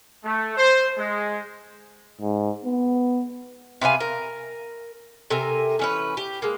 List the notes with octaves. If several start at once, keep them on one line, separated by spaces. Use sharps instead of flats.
A3
C5
G#3
G#2
B3
C3 B4 F5 G#5
A#4
C3 A4 A#4 G#5
E3 C#4 B4
G4
G#3 A#3